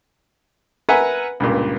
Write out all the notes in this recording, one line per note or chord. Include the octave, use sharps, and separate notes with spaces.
A#4 B4 E5 F#5 G#5 A#5
C#2 G2 A#2